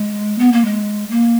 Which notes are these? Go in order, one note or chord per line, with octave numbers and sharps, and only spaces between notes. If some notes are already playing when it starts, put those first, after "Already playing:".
Already playing: G#3
B3
A#3
G#3
A#3